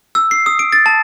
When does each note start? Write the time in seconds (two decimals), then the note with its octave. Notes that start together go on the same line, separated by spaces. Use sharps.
0.15 E6
0.31 C7
0.46 D#6
0.59 D7
0.72 A6
0.86 A5